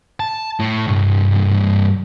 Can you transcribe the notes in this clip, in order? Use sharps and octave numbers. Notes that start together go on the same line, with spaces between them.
A5
A2
C2 G2